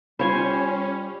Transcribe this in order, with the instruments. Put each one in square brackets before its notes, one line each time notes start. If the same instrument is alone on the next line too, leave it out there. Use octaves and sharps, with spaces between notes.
[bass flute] G3 [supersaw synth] C#4 [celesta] F4 F5 B5 [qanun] C5 C#5 G#5